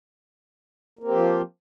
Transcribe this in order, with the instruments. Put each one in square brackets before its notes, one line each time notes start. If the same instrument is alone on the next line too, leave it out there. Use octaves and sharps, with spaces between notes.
[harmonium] A#3
C4
G4
F3
F4